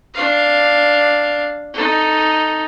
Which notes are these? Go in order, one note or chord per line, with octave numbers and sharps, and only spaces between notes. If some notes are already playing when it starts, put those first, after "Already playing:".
D4 F5
D#4 A4